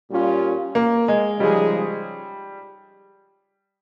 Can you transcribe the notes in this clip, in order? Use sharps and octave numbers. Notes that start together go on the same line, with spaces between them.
A#2 G3 C#4 F4
A#3
G#3
C#3 F3 G3 G#3 D#4 G#4